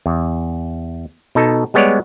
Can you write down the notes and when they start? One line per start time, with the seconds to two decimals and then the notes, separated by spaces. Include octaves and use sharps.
0.06 E2
1.35 B2 D#4 A4
1.74 G3 G#3 B3 C#5 D5